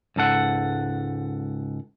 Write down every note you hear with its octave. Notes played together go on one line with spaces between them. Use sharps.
C#2 G#2 A4 F#5